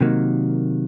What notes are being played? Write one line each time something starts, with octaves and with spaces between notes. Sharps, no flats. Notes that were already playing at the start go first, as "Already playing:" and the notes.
C3 D#3 F#3 A#3